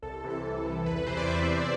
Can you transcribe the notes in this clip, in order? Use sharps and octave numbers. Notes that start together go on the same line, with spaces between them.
C2 A4
C3 E3
A4
C2
C3 E3
E2 B4
B4
C3 E3 C5
D5
E2 E5
C3 E3